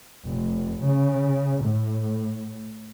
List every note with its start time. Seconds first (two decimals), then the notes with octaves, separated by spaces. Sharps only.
0.28 F1
0.84 C#3
1.64 A2